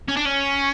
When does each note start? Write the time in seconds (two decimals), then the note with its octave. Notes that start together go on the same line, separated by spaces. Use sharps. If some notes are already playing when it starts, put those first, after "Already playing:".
0.09 C#4
0.17 D4
0.26 C#4